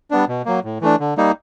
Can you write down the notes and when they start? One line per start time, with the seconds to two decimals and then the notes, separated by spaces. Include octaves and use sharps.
0.11 G3 B3 D4
0.28 B2
0.45 F#3 A#3
0.64 A2
0.81 E3 A3 D4
1.00 D3
1.17 G3 A#3 D#4